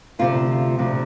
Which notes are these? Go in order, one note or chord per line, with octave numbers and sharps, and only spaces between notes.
D2 C3 F3 F4
D2 C3 F3